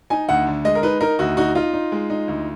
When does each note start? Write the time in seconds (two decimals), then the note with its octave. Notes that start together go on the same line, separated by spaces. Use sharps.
0.10 D#4 G#5
0.29 D2 F#5
0.47 D3
0.65 G#3 D#5
0.75 A#4
0.83 D#4 B4
1.00 D#4 A#4
1.19 D2 F#4
1.37 D#4 F#4
1.55 D#4 F4
1.73 D#4
1.92 G#3
2.10 D#4
2.28 D2